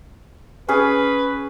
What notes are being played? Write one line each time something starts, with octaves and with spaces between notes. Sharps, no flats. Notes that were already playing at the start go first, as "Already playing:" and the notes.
C#4 G#4 B4